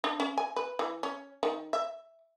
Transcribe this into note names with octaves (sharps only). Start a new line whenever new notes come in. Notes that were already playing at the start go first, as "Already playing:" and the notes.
D4
C#4
G#5
B4
E3
C#4
D#3
E5